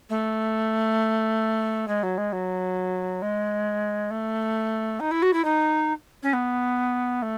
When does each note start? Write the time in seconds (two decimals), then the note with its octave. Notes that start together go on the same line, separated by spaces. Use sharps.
0.10 A3
1.88 G#3
2.03 F#3
2.18 G#3
2.32 F#3
3.22 G#3
4.11 A3
5.00 D#4
5.11 E4
5.22 F#4
5.33 E4
5.45 D#4
6.23 C#4
6.33 B3
7.22 A3